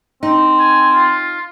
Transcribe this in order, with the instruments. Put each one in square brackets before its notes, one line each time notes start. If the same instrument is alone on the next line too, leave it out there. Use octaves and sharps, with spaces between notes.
[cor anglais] C4 [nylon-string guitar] D#4
[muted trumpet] G#5
F4